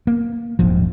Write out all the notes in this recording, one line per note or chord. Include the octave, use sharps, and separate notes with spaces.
A#3
D#1 A#1 G#2 F3